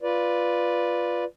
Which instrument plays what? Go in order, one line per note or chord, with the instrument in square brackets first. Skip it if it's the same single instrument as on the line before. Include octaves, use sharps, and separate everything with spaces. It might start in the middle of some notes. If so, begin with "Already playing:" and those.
[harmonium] F4 B4 D5